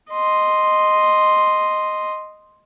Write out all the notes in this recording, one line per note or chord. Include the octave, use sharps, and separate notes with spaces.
D#5 C6